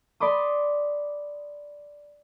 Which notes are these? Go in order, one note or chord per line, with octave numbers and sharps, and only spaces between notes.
D5 B5 C6 D6 D#6